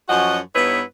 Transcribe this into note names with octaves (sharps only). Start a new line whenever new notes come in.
F#2 F3 C#4 F#4 D#5 F#5
G2 B3 D#4 E4 B4 C#5